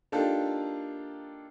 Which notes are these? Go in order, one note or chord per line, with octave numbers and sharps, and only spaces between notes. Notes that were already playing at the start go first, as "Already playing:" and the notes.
A#3 D4 D#4 F4 G4 A4